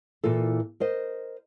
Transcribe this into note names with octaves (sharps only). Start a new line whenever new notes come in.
A#2 E3 F4 A4
A#4 C5 D#5